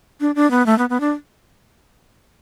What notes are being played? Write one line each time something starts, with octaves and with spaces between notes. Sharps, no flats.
D4
D4
B3
A3
B3
B3
D4